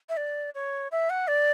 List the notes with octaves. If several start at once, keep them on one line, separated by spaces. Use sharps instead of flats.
E5
D5
C#5
E5
F#5
D5